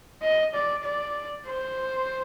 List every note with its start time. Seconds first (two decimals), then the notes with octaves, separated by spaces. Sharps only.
0.22 D#5
0.54 D5
0.84 D5
1.47 C5